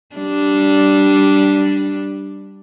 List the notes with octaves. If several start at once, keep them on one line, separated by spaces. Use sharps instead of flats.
G3 D4